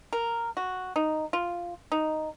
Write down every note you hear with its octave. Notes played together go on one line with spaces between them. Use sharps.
A#4
F#4
D#4
F4
D#4